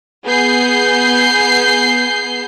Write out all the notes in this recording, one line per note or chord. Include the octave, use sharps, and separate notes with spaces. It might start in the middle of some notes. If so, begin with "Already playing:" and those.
B3 G#4 G6 C7